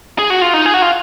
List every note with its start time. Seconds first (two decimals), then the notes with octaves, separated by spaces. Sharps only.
0.19 G#4
0.30 F#4
0.42 F4
0.53 D#4
0.66 G#4
0.74 F#4
0.82 F4